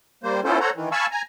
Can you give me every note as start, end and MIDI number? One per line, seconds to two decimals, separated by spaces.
0.23 0.40 55
0.23 0.40 58
0.23 0.40 72
0.44 0.59 59
0.44 0.59 61
0.44 0.59 64
0.44 0.59 65
0.44 0.59 69
0.44 0.59 72
0.60 0.70 69
0.60 0.70 72
0.60 0.70 73
0.60 0.70 78
0.60 0.70 82
0.76 0.89 51
0.76 0.89 52
0.92 1.06 77
0.92 1.06 80
0.92 1.06 81
0.92 1.06 83
0.92 1.06 85
0.92 1.06 88
1.11 1.22 80
1.11 1.22 82